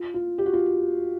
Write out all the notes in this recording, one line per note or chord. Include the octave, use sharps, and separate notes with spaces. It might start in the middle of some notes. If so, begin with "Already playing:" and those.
Already playing: F4
F4
G4
F#4
F4